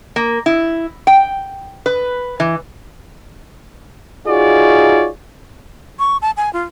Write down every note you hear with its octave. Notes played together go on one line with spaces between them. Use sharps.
A#3
E4
G5
B4
E3
D#4 F4 F#4 G#4 C#5 D5
C#6
A5
G#5
F4